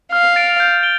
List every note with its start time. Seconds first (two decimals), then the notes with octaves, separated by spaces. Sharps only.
0.13 F5 F6
0.36 A6 D7 F7
0.60 G6
0.83 D7 G7